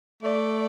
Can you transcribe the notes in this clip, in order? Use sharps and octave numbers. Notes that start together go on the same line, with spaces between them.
A3 D5